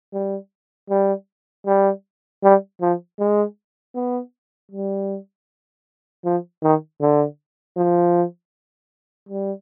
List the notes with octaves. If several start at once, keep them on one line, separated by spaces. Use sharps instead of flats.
G3
G3
G3
G3
F3
G#3
B3
G3
F3
D#3
D3
F3
G3